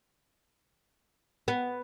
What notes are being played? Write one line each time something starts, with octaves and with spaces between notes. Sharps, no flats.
B3